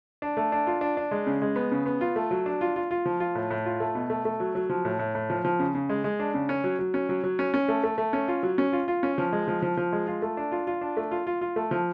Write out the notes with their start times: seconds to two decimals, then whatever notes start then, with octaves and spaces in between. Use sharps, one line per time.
0.22 D4
0.37 A3
0.52 D4
0.67 F4
0.81 D4
0.97 D4
1.11 G#3
1.27 C#3
1.42 G#3
1.56 B3
1.71 C#3
1.86 B3
2.01 F4
2.16 A3
2.31 F#3
2.46 D4
2.61 F4
2.76 F4
2.91 F4
3.06 F3
3.20 F4
3.35 A2
3.51 A2
3.66 F4
3.80 A3
3.95 B2
4.10 A3
4.25 A3
4.40 F#3
4.55 F#3
4.70 F3
4.85 A2
4.99 A2
5.15 A2
5.30 F3
5.45 F3
5.59 C#3
5.75 C#3
5.89 G#3
6.04 G#3
6.19 D4
6.34 C#3
6.49 C#4
6.64 F#3
6.79 F#3
6.94 C#4
7.09 F#3
7.24 F#3
7.39 C#4
7.54 C#4
7.68 A3
7.83 A3
7.98 A3
8.13 C#4
8.28 F4
8.43 F#3
8.58 C#4
8.73 F4
8.88 F4
9.03 C#4
9.18 F3
9.33 G#3
9.48 F3
9.62 F3
9.77 F3
9.93 G#3
10.07 F4
10.22 A3
10.37 D4
10.52 F4
10.67 F4
10.81 D4
10.97 A3
11.11 F4
11.27 F4
11.41 F4
11.56 A3
11.71 F3